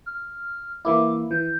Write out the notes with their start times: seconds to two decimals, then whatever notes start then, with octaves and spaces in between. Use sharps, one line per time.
0.06 F6
0.85 E3 A#3 E4 D6
1.31 E3 G6